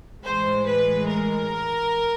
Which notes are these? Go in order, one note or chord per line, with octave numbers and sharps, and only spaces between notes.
A2 E3 G#3 C5
B4
A#4